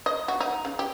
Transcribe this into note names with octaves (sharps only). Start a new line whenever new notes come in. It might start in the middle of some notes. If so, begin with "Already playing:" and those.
D#5
F#4
D#4
C#3
G4